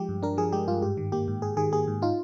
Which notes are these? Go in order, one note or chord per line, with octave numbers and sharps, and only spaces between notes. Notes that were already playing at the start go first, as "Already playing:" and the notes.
Already playing: F3 G#3 G4
G2
D4 A#4
F3 G#4
G#3 G4
G2 F4
G#2 G4
D#3
A#3 G4
G#2
G#2 G#4
D#3 G#4
A#3 G#4
G#2
D#4 F4